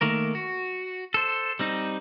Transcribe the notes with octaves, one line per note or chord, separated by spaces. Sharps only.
D#3 A3 A#3 A#4
F#4
A4 C5
G3 C4 D#4